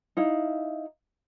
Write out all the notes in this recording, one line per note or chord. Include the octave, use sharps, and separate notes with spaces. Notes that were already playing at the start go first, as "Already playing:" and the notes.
D#4 E4 F5